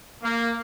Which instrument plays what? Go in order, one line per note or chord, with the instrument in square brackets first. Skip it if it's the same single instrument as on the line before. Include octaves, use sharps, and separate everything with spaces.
[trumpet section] A#3